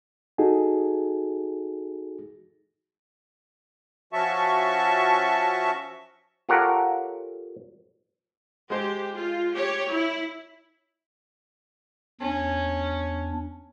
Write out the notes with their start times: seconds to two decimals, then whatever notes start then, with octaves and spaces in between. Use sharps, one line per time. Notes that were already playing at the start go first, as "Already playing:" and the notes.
0.38 D#4 F#4 G#4 A4
4.13 F3 C#4 F#4 E5 A5 C#6
6.49 F4 G4 A4 A#4 C#5 F#5
8.70 G#3 G4 C5
9.14 F4
9.55 G4 C#5
9.90 E4
12.21 E2 C#4 D4